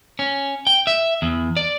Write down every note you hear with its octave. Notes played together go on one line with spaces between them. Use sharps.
C#4
G5
E5
E2
D5